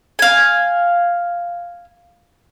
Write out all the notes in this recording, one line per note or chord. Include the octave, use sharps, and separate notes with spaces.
F5 G#5